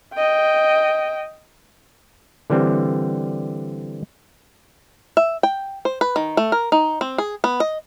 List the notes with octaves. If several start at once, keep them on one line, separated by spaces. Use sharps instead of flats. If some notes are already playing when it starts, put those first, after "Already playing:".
D#5 G5
D3 E3 G3 C4
E5
G5
C5
B4
D#3
A3
A#4
D#4
C4
G#4
B3
D#5